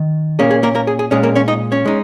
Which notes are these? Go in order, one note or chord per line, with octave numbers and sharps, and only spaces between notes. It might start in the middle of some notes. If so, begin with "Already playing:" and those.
Already playing: D#3
A#2 A#3 C#4 G#4
G#4
A#3 A#4
A#3 A#4
G#4
G#4
A#2 G#3 C#4 G#4
A#3 A#4
C#4 C#5
D#4 D#5
C#4 C#5
G#3 D#4